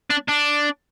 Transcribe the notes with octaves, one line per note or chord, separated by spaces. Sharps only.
D4
D4